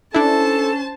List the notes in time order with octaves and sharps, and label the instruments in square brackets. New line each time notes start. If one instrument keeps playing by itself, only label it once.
[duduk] C#4 [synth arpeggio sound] D4 E4 [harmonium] A4 [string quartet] C5 A5